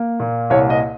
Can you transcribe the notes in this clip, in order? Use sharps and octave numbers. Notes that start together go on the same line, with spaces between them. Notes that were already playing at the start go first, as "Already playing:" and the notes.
Already playing: A#3
A#2
C2 C#5
D#5